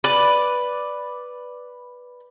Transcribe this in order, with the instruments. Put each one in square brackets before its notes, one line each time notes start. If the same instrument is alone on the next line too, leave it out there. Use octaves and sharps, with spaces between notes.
[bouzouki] B4 D5